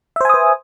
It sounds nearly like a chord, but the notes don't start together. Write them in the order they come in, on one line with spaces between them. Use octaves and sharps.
E5 C5 G#5 D#6 B4